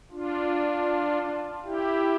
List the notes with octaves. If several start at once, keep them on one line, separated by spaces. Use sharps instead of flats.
D4 F4
E4 G4